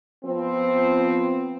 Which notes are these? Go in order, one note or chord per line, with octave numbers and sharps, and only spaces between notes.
F3 B3 C4